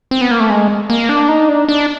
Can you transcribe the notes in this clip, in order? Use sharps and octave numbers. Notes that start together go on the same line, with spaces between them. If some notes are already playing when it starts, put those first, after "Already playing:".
C4
B3
A#3
A3
G#3
A#3
D4
D#4
D4
D4